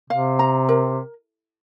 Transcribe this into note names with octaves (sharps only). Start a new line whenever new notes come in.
C3 F5
A#5
A#4